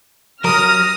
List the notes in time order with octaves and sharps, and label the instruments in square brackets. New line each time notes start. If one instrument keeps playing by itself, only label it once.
[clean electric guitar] F#3 A#4 [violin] D#6 [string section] F6 A#6